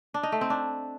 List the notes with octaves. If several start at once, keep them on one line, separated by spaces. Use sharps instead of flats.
D4
D#4
A3
C4
D4